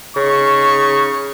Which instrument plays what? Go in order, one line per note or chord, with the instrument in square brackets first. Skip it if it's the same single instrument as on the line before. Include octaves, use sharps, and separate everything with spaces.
[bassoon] C#3 [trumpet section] D#4 C#6